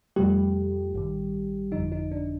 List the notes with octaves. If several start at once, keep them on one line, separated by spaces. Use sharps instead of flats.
F2 C3 F3 G3 A3 G4
A1 G2 D#3
G1 F2 D3 F3 D#4
D#4
D4